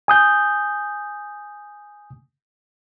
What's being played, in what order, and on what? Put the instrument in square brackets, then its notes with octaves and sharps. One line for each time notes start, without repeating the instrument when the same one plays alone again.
[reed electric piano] G#5 D#6 G6